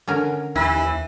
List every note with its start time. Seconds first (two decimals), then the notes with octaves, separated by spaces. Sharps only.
0.07 D3 C#4 A#4
0.56 D#2 E3 E4